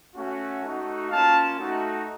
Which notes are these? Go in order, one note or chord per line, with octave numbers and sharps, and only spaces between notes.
A3 C#4 F#4
A3 D#4 F#4
A#3 C#4 F4 F5 A5
A3 D#4 F#4